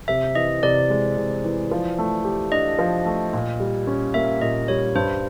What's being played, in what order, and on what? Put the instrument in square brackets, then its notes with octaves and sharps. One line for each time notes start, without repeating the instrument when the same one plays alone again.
[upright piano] C3 [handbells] E5
[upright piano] E3 [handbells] D#5
[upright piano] C3 [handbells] D5
[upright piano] G#3
C3
E3
F3
A3
G4
[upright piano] D4 [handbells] D#5
[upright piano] F3
A3
A#2
G3
C#4
[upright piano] A#3 [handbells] E5
[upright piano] A#2 [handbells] D#5
[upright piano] G3 [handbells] C#5
[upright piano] G2 [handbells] C5